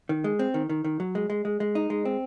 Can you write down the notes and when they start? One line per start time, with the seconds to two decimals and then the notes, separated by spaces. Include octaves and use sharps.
0.09 D#3
0.24 G#3
0.39 C4
0.54 D#3
0.69 D#3
0.84 D#3
1.00 F#3
1.15 G#3
1.30 G#3
1.45 G#3
1.60 G#3
1.75 D#4
1.90 G#3
2.05 C4